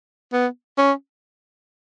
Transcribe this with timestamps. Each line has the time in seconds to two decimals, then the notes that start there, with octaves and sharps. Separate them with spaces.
0.33 B3
0.78 C#4